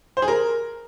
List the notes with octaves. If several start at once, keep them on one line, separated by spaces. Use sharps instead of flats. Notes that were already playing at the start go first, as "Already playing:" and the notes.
C5
G#4
A#4